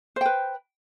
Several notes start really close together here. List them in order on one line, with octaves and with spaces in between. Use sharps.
C5 G5 B4